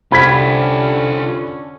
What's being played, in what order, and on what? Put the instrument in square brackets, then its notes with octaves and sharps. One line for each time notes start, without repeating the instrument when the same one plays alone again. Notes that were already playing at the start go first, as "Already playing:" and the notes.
[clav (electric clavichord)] C2 [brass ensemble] D3 C#4 [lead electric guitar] F4 G4 [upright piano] B5 G#6 B6